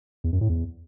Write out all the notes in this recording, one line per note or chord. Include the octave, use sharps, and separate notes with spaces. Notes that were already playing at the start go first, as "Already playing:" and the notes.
E2
F#2
A2
E2